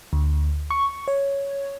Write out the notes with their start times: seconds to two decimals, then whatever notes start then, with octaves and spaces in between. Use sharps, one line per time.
0.13 D2
0.70 C#6
1.08 C#5